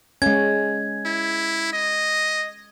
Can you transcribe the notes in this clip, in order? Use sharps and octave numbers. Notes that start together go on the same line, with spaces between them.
G#3 C#4 G#6
E4
D#5